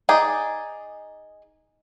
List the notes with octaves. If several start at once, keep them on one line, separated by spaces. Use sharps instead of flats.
D#4 G#4 D5